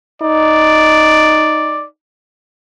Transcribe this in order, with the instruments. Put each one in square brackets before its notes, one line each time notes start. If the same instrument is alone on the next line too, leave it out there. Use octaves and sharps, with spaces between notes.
[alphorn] D#4 [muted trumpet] D5